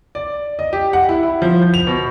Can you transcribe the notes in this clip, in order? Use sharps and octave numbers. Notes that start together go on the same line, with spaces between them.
D5
D#5
G4
F#5
E4
E4
F3
G6
F7
B2